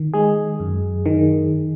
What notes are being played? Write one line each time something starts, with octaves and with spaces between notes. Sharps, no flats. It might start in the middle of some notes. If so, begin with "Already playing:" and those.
Already playing: D#3
G#3 G#4
F#2
D#3